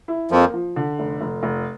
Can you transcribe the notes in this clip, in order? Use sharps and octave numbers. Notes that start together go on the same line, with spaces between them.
E4
F2 F3 A#3
F3
D3
F1
F1
F1